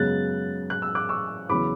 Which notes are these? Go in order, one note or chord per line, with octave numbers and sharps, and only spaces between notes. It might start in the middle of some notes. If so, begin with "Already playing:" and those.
Already playing: F#2 C#3 G#3 B3 F#6 A6
F#6
E6
D6 F#6
C#6 E6
E2 C#3 F#3 B3 B5 D6